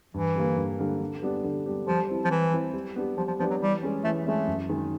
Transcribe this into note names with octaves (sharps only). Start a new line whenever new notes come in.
G2 E3
D3 G3 A#3
G2
D3 G3 A#3
D3
G3 B3 D4 G4
D3
G3 B3 D4 G4
F3 G3
C4 E4
F3
E3 G3
C4 E4
G3
B3 D4 G4
F3 G3
F3
F3 B3 D4 G4
F#3
E3 G3
G#3 C#4
E3 A3
G#3 A3 C#4
F#2
D#3 G#3